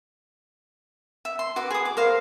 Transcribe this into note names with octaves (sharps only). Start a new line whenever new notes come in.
E5
C6
F#4 B4 D6
G#4 D#6
D6
A#4 C5 F5